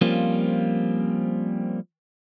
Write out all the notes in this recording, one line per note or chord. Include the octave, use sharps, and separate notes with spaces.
F3 G3 A#3 C4 C#4 F4